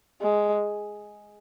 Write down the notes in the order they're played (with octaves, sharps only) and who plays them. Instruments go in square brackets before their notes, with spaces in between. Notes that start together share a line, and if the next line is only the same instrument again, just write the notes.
[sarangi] G#3